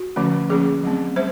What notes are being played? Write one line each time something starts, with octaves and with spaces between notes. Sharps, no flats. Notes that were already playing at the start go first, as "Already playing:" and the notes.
Already playing: F#4
D3 F3 A3 C#4
F3 A#3 C#4 G#4
F#3 A3 C4
G3 C5